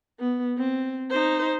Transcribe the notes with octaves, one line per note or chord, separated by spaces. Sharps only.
B3
C4
D#4 C5